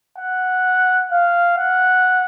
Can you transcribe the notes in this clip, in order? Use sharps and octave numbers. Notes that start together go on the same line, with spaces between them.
F#5
F5
F#5